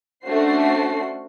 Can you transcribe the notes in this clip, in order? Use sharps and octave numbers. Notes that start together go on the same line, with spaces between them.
A3 C#4 D4 F#4 C5 C7